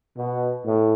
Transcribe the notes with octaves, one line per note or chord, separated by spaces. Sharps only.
B2
A2